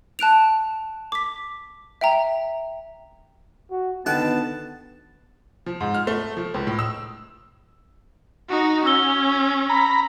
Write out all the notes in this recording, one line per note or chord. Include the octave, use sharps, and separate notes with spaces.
A5 F#6 D7 F7
D6 B6
E5 G5 A#5
F#4
B2 D3 D#3 B3 F#5 G5 A5
F3
G#2
F6
A3
F3
C#2
A2
E6
D#4 F#4
C#4 E6 G7
A#5 B5